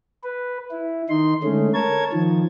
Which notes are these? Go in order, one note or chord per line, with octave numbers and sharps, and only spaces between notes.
B4
E4
D#3 D#4 C6
D3 G#3 A3 C#4
A#4 C#5 A5 G#6
D#3 F3